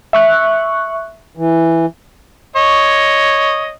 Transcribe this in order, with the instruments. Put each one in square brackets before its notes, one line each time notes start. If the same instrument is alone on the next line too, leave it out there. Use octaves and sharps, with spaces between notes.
[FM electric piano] E5 C#6 F#6
[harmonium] E3
[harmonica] C#5 D#5